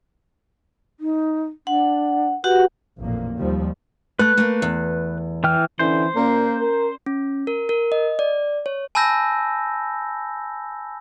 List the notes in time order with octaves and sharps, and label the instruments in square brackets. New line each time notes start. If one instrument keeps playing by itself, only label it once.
[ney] D#4
[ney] D4 [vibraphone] F#5
[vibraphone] F#4 G4 F#5 [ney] B4
[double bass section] A1 F2 A#2 A#3
D#2 D#3 F3 G3
[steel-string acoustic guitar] A3 [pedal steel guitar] B4 F#6
[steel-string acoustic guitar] A3 A#3
E2
[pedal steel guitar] E3 G5 F6
[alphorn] D3 [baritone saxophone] E3 [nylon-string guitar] C#4 D#4 [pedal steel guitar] C5
[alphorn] A#2 [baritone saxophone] A#3 [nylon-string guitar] C#4 D5
[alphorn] A#4
[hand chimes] C#4
A#4
A#4
D#5
D5
C#5
[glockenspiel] G#5 A5 B5 E6 G6 A#6